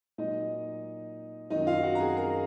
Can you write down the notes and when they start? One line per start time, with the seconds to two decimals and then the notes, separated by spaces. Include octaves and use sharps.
0.18 A#2 F#3 D#4 D#5
1.50 F#2 D#3 F#3 D#4 D#5
1.67 F4 F5
1.83 F#4 F#5
1.95 A#5
2.00 G#4 G#5
2.17 A#4 A#5